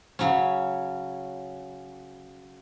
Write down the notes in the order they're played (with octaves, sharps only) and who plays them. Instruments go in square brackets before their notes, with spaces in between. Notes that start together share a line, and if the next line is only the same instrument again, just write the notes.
[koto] C#3 F#3 C#4